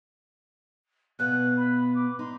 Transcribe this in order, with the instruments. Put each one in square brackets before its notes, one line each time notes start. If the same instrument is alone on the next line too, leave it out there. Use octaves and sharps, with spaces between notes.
[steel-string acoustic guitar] B2 B3 F5 [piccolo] F#6
[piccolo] B5
D6
[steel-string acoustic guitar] D#4 [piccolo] C6